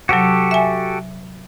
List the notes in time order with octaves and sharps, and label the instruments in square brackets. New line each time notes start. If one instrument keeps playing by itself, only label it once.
[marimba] C3 F#3 [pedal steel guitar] F#4 G4 A4
[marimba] E5 G#5